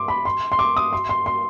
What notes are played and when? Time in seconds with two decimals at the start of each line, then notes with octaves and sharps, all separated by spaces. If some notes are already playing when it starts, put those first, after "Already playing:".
Already playing: C6 D6
0.08 B5
0.25 C6
0.52 C6
0.59 D6
0.76 D#6
0.93 C6
1.09 C6
1.26 C6